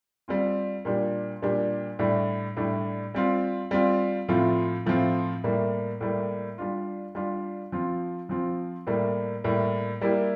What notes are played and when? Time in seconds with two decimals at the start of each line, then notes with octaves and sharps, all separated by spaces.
0.28 G3 C4 F4
0.85 A#2 G3 D4 G4
1.42 A#2 G3 D4 G4
1.99 A2 G3 D4
2.57 A2 G3 D4
3.14 G3 C4 F4
3.71 G3 C4 F4
4.29 A2 F3 C4 F4
4.86 A2 F3 C4 F4
5.44 A2 G3 A#3
6.01 A2 G3 A#3
6.58 G3 D4 F4
7.15 G3 D4 F4
7.72 F3 C4 F4
8.29 F3 C4 F4
8.87 A2 G3 A#3
9.44 A2 G3 A#3
10.01 G3 A#3 E4 G4